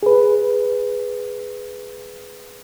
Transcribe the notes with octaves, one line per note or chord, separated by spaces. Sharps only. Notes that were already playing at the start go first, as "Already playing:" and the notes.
G#4 B4